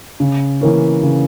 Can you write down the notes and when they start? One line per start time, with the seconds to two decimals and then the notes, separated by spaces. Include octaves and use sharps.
0.20 C#3
0.61 E3 A#3 C#4
1.03 C#3